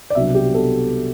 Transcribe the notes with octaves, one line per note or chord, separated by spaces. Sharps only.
D5
C2 B2 F#3 B3 D4 E5
G4
B2 A4